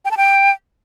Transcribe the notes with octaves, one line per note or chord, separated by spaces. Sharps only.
G5
A5
G5